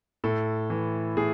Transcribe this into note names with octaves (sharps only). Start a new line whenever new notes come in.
A2 A4
E3
A2 G#4